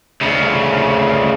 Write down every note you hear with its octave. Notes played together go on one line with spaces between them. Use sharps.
D2 C#3